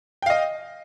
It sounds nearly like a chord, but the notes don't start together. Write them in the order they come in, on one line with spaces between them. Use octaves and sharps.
G5 F5 D#5